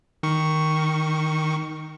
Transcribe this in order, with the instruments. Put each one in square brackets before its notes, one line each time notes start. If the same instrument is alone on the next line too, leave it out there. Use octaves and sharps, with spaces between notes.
[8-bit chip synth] D#3 C#6